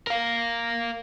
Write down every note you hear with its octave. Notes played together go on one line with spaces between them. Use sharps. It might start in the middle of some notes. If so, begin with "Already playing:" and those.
A#4 F5